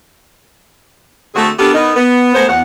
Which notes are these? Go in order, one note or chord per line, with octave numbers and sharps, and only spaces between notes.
D3 A3 C4 F#4 G#4 A4
B3 D4 G4 A4 A#4
B3 D#4 A#4
B3
G#3 A3 B3 A#4 C5
E2 F#5